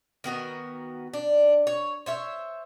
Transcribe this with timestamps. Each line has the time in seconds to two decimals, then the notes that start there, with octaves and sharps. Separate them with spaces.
0.24 D#3 B3 F#4 A#4
1.14 D4
1.67 C#5
2.06 C5 C#5 E5